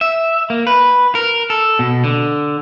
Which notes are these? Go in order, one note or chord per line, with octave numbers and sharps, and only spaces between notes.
E5
A#3
B4
A#4
A4
B2
D3